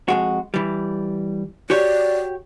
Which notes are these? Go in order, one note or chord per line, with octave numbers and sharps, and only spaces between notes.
F2 G#3 F#4
E3 G3
F#4 G4 C#5 D5